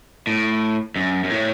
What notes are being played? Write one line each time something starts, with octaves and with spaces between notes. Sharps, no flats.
A2
F#2
F#2
A2